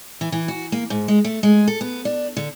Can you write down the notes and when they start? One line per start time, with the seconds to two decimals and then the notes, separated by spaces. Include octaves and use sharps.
0.21 E3
0.32 E3
0.48 F#4
0.72 A#3
0.90 G#2
1.08 G#3
1.24 A3
1.43 G#3
1.68 A4
1.81 B3
2.05 D4
2.37 D3